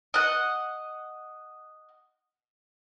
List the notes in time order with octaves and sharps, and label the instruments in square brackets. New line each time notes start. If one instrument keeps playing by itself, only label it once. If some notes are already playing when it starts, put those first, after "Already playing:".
[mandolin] D#5 F#5